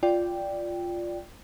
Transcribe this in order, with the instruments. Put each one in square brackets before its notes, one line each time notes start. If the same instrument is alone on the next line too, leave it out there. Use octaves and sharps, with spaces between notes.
[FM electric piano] F4 D5 G5